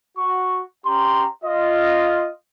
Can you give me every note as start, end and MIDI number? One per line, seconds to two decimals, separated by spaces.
0.18 0.62 66
0.18 0.62 85
0.86 1.25 61
0.86 1.25 67
0.86 1.25 82
0.86 1.25 84
1.44 2.29 65
1.44 2.29 75